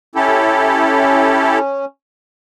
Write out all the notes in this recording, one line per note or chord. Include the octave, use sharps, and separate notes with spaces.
C#4 E4 G4 A4